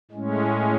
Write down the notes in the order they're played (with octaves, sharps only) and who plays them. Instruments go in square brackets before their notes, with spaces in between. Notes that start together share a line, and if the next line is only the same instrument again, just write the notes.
[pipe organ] A2 G#3 C#4